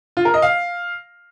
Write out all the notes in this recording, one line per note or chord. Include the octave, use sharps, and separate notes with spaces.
F4
A#4
D#5
F5